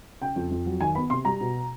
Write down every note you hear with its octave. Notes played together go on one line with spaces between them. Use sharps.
C#3 G5
F2
F2
F#3
D#3 G#5
B3 B5
C3 C6
G3 A#5
B2